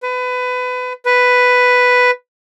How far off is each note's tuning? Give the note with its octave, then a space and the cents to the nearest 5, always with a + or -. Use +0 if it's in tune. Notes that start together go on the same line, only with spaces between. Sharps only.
B4 +25
B4 +5